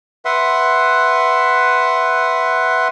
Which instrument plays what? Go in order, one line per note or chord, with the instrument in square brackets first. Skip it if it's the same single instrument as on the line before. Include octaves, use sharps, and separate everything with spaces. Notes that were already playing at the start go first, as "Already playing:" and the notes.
[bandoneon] B4 E5 F#5 C6